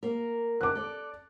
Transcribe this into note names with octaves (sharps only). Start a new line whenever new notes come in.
A#3 A#4
D#3 D6 F#6
A4 D5